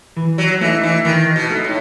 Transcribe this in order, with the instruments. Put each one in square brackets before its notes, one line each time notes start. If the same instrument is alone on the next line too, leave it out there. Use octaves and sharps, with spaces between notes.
[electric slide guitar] E3
[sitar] F#3
[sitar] E3 [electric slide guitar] A3 D#4
[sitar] E3
[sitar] D#3 [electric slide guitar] E3
[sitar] B2
[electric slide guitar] A3 D#4
[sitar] A2